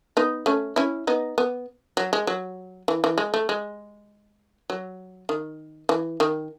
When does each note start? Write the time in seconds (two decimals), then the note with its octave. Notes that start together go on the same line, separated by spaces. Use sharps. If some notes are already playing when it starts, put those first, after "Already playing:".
0.17 B3 D#4
0.46 A3 C#4
0.76 C#4 E4
1.07 B3 D#4
1.38 B3
1.97 F#3
2.13 G#3
2.27 F#3
2.88 E3
3.04 E3
3.18 G#3
3.34 A3
3.49 G#3
4.70 F#3
5.29 D#3
5.89 E3
6.20 D#3